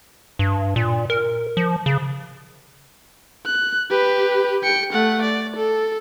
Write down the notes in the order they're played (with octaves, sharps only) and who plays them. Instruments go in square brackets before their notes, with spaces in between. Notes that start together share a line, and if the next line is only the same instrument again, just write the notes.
[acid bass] G2
A#2
A#4
F3
C#3
[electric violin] F#6
G4 B4
G5 C#7
A3 F#5
D5
A4